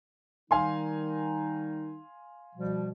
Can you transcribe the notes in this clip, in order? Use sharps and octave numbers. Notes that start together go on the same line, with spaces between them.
D#3 G3 D#4 F5 G#5 C6
B2 F3 G3